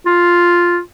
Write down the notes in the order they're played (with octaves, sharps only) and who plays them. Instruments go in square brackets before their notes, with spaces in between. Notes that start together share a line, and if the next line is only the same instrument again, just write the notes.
[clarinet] F4